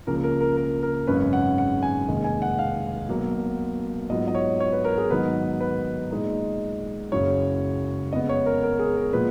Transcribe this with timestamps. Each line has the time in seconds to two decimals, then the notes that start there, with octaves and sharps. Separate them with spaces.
0.07 C#2 C#3 F3 A#3 C#4 A#4
0.24 A#4
0.41 A#4
0.57 A#4
0.83 A#4
1.07 G#1 F#2 C#3 G#3 C#4 B4
1.33 F#5
1.58 F#5
1.83 G#5
2.08 F1 D#2 D#3 G#3
2.24 G#5
2.42 F#5
2.59 F5
3.09 B1 B2 F#3 A#3
4.09 G#2 F#3 B3 F4 D#5
4.28 D#5
4.35 C#5
4.60 C#5
4.72 B4
4.85 A#4
4.98 G#4
5.10 G#2 D#3 F#3 B3 D#4 B4
5.61 B4
6.11 A#2 G#3 D#4
7.11 F#1 F#2 C#3 F#3 C#5
8.13 F2 C#3 G#3 B3 D#5
8.29 C#5
8.46 A#4
8.63 A#4
8.79 G#4
8.97 A#4
9.13 A#2 F3 G#3 B3 B4